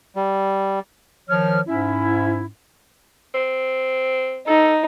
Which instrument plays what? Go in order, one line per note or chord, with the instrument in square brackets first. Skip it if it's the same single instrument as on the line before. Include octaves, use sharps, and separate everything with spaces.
[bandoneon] G3
[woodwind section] D#3 F3 C#5 F6
G#2 C#4 E4
[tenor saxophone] C4
[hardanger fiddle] D#4 [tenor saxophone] A4